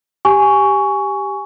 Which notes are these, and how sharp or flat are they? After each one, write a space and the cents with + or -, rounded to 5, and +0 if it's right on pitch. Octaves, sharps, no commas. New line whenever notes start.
G4 +0 G#5 +0 C#6 +15